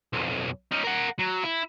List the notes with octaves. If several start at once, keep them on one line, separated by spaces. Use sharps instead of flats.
B1 F2
C#4 D#4
A#4 F#5
F#3
E4